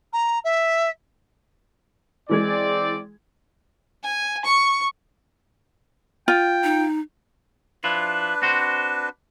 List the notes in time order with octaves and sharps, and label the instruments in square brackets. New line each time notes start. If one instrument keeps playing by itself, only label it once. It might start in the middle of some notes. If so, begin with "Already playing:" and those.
[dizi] A#5
E5
[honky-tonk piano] E3 G#3 G#6 [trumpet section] C4 D5
[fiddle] G#5
C#6
[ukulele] F4 [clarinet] G5
[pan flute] D#4
[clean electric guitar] F3 E4 F4 [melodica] D4 B4
[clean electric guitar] C4 F#4 C5